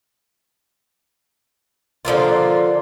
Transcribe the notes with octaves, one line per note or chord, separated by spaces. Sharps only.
D3 F3 A#3 F4